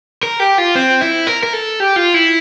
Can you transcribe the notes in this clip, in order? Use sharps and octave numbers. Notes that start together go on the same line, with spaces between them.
A#4
G4
F4
C4
E4
A#4
A#4
A4
G4
F4
E4